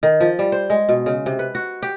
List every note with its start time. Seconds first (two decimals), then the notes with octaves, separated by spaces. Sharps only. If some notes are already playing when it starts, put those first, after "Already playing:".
0.03 D#3
0.21 F3
0.39 G3
0.52 C5
0.70 G#3
0.89 B2
1.06 C#3
1.26 C3
1.39 B4
1.55 F#4
1.82 G4